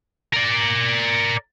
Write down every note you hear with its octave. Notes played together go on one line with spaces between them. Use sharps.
A#4 D5